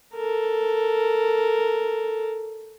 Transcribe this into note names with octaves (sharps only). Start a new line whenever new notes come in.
A4 A#4